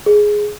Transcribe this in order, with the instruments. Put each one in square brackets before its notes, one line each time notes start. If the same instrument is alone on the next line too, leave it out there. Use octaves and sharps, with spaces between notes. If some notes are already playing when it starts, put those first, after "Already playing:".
[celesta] G#4